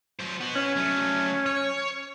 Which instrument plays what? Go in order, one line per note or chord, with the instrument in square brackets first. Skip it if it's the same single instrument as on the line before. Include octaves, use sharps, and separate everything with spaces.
[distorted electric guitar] F#3 C5
B3 F#4
[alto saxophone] C#4
[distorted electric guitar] F#3 A3
C#5